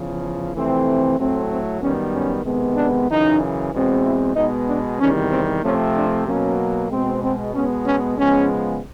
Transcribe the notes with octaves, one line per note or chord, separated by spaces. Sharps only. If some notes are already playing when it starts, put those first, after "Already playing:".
Already playing: E2 C#3 F3
F2 C3 E3 A3 C4
A2 F#3 A3 C4
C4
F#2 D#3 G3 B3 C#4
C#4
C3 D#3 G#3 B3
D4
F#2 C#3 E3 D#4
E2 B2 G#3 C4
E4
B2 G#3 B3 D#4
D4
E2 C3 D#3 G3 C4 C#4
C4
C3 F3 A3 C4 C#4
D4
B2 F#3 A#3 C#4
B2 G#3 C4
C4
B2 G#3 B3 C#4
C#4
C#3 F3 G#3 B3 C#4